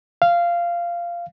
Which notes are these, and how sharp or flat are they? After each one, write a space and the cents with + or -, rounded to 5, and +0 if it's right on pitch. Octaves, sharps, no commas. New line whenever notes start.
F5 -15